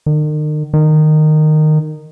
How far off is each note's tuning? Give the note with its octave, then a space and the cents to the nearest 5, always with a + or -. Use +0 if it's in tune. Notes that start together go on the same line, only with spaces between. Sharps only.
D#3 -40
D#3 -15